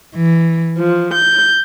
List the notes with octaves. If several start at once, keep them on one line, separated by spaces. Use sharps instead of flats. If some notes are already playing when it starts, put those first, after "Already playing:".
E3
F3
G6